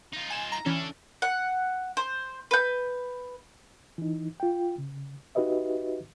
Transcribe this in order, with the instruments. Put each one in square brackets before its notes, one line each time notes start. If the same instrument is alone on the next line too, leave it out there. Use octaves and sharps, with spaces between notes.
[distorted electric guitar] D#4 F4
[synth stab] G#5 E7
A#5
[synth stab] E3 C#4 [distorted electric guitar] D4 A4
[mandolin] F#5
C5
B4 G6
[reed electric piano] E3 D#4
F4 G5
C#3
D#4 F#4 G4 B4 D#5 E5